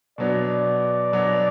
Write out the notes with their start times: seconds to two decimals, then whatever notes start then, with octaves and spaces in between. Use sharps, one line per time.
0.18 B2 F#3 B3 D4 D5
1.12 B2 F#3 B3 D4